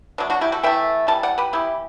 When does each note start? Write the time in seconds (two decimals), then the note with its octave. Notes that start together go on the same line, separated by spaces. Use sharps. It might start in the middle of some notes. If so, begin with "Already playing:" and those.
0.18 B2 F#3 A3 D4
0.30 D4 F#4
0.41 E4 G4
0.52 F#4 A4
0.63 E3 A3 E5 G5
1.08 E3 G3 A5
1.23 D5 F#5
1.38 G4 B4
1.53 E3 G3 B3 E4 G4